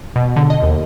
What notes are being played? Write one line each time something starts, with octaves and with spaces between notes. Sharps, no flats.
B2
D3
D#5
D#2